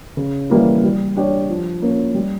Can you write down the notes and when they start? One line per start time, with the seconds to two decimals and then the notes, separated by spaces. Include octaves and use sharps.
0.17 C#3
0.50 E3 G3 A#3 E4
0.83 G3
1.17 D4 G4 C#5
1.49 F3
1.82 A#3 C#4
2.14 G3